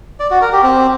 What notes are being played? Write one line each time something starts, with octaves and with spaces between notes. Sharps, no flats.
D5
F#4
A#4
G4
C4